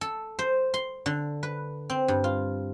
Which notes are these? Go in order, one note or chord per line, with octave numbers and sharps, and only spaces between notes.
A4
C5
C6
D3
B4
C4
G2
F4